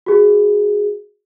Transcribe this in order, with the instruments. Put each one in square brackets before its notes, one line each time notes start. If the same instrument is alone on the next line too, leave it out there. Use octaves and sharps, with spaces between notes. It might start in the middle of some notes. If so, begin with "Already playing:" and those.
[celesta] F#4 G#4